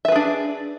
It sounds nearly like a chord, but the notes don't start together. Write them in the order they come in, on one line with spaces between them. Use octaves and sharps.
E5 B4 G#4 D4